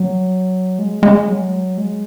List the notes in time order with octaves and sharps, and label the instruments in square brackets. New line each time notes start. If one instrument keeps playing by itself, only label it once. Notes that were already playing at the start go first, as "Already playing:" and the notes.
Already playing: [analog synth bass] F#3
G#3
G#3
F#3
G#3